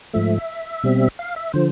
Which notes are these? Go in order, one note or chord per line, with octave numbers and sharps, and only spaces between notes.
G#2 F3 A3 E5
B2 G3 C4
F5
E5
D3 F3 C5